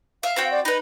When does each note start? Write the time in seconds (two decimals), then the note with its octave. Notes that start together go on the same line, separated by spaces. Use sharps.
0.23 E5 F5
0.36 C4 F#4 G5
0.51 D5
0.65 D#4 B4 B5